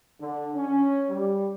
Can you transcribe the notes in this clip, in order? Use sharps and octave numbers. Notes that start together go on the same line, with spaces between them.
D3
C#4
G3